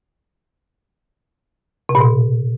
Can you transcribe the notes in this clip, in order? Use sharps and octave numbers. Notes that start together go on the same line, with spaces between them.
C3
A#2
B2